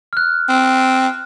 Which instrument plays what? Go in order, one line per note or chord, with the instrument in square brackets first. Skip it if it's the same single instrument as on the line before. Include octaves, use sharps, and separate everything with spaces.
[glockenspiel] F6 F#6
[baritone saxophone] C4